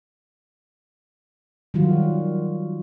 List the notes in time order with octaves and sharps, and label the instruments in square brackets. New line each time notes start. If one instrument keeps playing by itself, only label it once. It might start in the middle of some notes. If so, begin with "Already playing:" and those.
[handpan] D#3 F#3 G3 F4 F#4